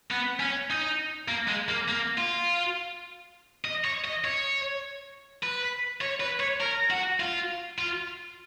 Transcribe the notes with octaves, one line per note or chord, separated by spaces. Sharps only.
B3
C#4
D#4
A#3
G#3
A#3
A#3
F4
D#5
C#5
D#5
C#5
B4
C#5
B4
C#5
A#4
F#4
F4
F4